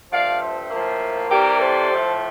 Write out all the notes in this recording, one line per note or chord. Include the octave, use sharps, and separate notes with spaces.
G2 F3 A3 D5 F5
C5 E5
A2 F3 A#3
C3 E3 G3 G4 A#4
A4 C5
A2 F3 A3